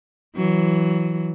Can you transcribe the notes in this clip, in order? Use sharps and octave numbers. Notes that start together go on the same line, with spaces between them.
E3 F#3